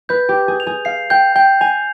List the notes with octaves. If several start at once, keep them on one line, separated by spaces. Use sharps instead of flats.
B4 G6
G4
G6
G#4
F7
G#4
F5 C7
G5 G6
G5 G6
G#5 F7